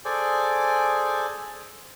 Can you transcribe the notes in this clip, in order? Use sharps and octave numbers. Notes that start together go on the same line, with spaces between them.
G#4 A4 C5 D5 G#5 D6